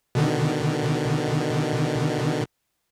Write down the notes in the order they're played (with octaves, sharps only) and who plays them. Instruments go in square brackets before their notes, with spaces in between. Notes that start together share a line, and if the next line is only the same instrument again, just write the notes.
[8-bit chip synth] B2 D3 D#3